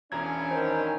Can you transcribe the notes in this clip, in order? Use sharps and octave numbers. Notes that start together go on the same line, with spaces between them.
E1 C#4 D4 E4 A#5 G#6
D#3 C5